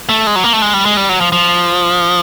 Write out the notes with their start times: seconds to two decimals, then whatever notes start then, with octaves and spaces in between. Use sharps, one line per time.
0.09 A3
0.27 G#3
0.36 F#3
0.44 A#3
0.53 A3
0.62 G#3
0.74 G3
0.85 G#3
0.97 G3
1.09 F#3
1.21 F3
1.32 F3